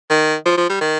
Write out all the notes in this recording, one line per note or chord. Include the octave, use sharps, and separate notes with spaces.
D#3
F3
F3
G3
D#3